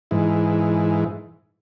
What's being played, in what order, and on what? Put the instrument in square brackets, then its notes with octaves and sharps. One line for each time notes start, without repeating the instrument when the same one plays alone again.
[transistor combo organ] G#2 E3